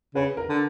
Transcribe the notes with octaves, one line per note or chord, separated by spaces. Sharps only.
C#3 B4
A#4
D3